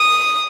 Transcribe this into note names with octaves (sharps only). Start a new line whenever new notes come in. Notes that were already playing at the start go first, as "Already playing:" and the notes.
Already playing: D#6